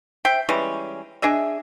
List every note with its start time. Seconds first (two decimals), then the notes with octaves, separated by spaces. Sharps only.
0.25 C5 E5 G5
0.49 E3 G3 G#3 C#4
1.22 D4 G#4 D#5 E5